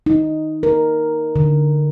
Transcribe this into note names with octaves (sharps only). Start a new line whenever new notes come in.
D#4
A#4
D3